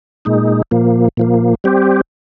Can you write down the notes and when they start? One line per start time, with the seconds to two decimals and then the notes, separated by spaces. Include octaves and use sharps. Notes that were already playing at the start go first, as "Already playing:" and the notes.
0.25 A#2 G#3 D#4
0.71 A#2 F3 A#3
1.17 A#2 F3 A#3
1.64 G3 C4 G4